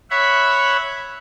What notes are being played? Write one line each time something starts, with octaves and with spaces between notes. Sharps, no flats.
C#5 E5 F#5 B5